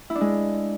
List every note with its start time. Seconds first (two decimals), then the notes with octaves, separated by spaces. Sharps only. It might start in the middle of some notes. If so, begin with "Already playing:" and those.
0.10 E4
0.15 D4
0.21 G#3